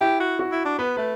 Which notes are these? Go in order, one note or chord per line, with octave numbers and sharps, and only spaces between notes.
E4 G4
F#4
F#4
E4
D4
B3 B4
A3 B4